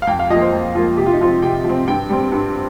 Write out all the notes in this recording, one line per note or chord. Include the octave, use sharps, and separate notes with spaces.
F5
F2 G5
F5
F3 A#3 D#5
C5
F2
F3 A#3 F4
C3 G4
F4
D#4
F3 C4 F4
C3 G5
F3
C4
G2 G5
G3 C4
G2